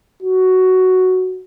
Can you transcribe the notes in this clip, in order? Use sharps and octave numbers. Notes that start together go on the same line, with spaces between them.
F#4